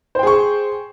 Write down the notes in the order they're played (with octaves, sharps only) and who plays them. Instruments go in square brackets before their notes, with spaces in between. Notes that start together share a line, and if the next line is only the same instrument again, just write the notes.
[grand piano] C5
G5
G#4
C#6